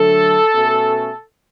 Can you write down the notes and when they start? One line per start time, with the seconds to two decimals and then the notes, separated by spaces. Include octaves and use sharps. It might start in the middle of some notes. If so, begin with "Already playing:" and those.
Already playing: D3 F#3 A3 A4
0.54 B2 A3 C#4